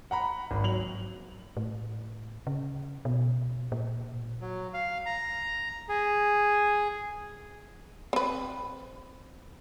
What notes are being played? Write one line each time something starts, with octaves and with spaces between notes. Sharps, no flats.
F#5 A#5 B5
G#1
F#3 F7 F#7
A2
C#3
B2
A#2
F#3
F5
A#5
G#4
C4 B4